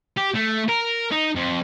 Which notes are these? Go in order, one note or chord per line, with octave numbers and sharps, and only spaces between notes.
G4
A3
A#4
D#4
F2